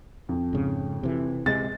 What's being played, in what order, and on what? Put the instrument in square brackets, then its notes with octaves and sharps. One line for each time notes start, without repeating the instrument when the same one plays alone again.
[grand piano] F2
[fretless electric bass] G#2 C#3
C3 E3
[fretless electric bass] C3 G#3 [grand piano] A6